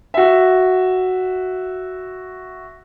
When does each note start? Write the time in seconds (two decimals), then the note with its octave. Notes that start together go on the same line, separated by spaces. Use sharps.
0.14 F#4 E5